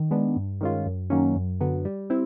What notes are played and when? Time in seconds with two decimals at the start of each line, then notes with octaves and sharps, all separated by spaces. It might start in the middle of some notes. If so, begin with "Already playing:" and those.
Already playing: D#3
0.11 G#3 B3 D4
0.36 G2
0.61 D#3 G#3 C#4 F4
0.86 F#2
1.10 D#3 F#3 A#3 C#4
1.36 F#2
1.60 D3 F#3 B3
1.85 G3
2.10 C4 E4